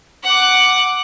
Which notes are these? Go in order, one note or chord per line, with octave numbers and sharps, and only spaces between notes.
F#5 D6